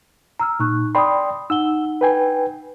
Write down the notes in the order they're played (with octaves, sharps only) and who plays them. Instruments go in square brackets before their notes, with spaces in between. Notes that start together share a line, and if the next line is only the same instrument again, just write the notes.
[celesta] A#5 E6 F6
[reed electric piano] A#2 [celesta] D#4 C#6 F#6
[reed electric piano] D5 G5 C6 [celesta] B5 D#6
[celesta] D#4 F#5 G7 [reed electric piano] E6
[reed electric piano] B4 G5 G#5